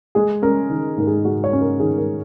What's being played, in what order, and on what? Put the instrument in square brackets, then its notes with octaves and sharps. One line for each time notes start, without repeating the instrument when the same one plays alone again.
[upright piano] G#3 G#4
C#4 A#4
D#3
G#2 A#4
G#4
G#3 F#4
C#5
C#4
A#4
D#3 G#4
A#4